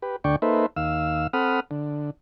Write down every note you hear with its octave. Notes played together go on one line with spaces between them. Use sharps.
G4 B4
D2 D3 D5 G5 C#6
A#3 D#4 A4 B4 C5 E5
D#2 F5 E6
C4 A4 F#5 B5 D#6 F6
D3